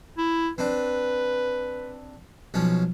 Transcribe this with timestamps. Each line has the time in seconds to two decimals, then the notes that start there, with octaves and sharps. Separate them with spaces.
0.18 E4
0.58 C4 D4 B4
2.54 B1 F3 C#4